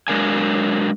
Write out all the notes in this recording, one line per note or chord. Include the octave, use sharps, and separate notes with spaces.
F#3 G#3 D4 A#4 F5 G#5